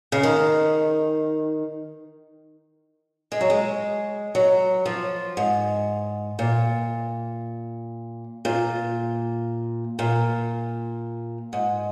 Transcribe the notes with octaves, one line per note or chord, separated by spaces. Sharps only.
C#3
D#3
G#3
F#3
G#3
F#3
F3
G#2
A#2
A#2
A#2
G#2